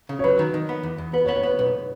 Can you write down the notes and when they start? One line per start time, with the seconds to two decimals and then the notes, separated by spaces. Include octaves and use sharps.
0.09 C#3
0.19 C#5
0.24 F#3 B4
0.39 D#3
0.54 D#3
0.69 B3
0.83 E2
0.98 E2
1.13 B3 B4
1.25 C#5
1.29 B3
1.36 C#5
1.43 B3 B4
1.59 B1 B4